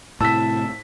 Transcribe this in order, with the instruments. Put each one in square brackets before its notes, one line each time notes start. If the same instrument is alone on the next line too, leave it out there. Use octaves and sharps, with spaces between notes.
[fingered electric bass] A2 C3 [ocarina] E4 [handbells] A5 [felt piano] E6 B6